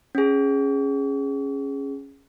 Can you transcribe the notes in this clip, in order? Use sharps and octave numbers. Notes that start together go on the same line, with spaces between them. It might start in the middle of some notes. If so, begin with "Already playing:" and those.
C#4 G#4